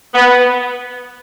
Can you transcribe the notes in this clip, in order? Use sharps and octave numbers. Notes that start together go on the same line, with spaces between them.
B3